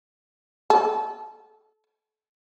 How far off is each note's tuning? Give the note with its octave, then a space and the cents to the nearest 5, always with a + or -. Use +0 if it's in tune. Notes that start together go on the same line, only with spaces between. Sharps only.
A4 -30